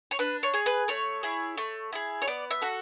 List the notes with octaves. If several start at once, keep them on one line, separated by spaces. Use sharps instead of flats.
C#5
D4 B4
C#5
G#4
B4
A3 C#5
E4 G#4
A3
E4 G#4
C#5
B3 D5
E5
F#4 A4